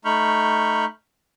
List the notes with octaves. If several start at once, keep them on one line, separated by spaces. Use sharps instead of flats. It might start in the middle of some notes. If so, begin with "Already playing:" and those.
A3 D#4 B5 C#6 F6 G6